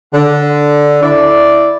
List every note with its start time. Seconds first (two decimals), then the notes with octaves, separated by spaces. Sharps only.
0.13 D3
1.02 E4 D5